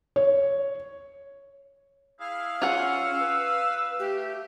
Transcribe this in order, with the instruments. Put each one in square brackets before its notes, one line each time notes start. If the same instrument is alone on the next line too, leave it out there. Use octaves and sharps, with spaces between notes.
[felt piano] C#5
[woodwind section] E4 G#4 [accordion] F5
[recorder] C#4 [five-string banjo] F4 G#4 F#5 [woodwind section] E6
[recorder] B4
[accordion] A3 [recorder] G4